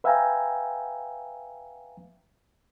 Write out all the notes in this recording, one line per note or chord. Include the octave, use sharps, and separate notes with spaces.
B4 E5 F5 G5 G#5 A#5